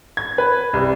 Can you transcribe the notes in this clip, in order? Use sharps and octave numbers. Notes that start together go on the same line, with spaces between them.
G#6
B4
C2